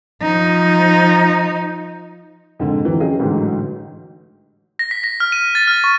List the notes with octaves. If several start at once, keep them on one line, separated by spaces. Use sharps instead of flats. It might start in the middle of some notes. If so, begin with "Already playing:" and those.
F3 D#4
F2 G#2 D3
F2 E3 F#3
C#4 G#4 D#5 G5
A1 G#2 D3 E3 F#3
A#6
B6
A#6
F6
D#7
A6
F6
C#6